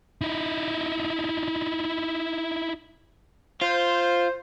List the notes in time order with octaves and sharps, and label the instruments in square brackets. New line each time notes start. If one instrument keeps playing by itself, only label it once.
[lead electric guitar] D#4 E4
[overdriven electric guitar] F4 [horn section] C5